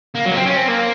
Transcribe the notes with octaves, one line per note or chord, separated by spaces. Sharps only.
A#3
F#3
A#3
C4
C#4
C4
A#3